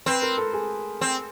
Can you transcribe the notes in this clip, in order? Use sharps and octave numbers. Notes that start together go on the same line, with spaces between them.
C4 B4
A#4
A4
G#4
C4